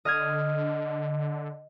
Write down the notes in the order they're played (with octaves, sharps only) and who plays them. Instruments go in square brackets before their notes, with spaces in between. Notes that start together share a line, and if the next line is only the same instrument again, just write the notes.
[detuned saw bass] D3 [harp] D#5 F6 G#6